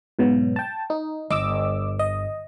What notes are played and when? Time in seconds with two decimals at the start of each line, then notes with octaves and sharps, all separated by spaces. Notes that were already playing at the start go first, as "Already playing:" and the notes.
0.19 G#2 B2 F#3
0.56 G5 A5
0.90 D#4
1.30 G1 D#5 D6 E6
1.99 D#5